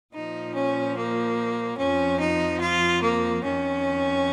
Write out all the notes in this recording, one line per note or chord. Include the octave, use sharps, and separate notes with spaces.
A#2 F3 D#4
C#4
A#3
F2 F3 C#4
D#4
F4
A#3
F2 D#3 C#4